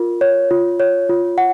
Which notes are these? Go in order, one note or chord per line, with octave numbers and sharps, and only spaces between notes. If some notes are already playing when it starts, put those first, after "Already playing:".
Already playing: F4 A#4
C#5
F4
C#5
F4
F#5